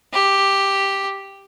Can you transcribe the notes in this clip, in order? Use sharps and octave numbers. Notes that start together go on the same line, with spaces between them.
G4